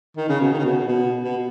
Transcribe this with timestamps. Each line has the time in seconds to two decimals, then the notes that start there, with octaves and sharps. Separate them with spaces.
0.17 D#3
0.29 C#3
0.41 B2
0.52 D#3
0.59 C#3
0.65 B2
0.88 B2
1.24 B2